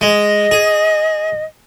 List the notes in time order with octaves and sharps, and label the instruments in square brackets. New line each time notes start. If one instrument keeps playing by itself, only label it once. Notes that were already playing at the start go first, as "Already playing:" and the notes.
[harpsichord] G#3 [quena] D#5
[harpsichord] G#4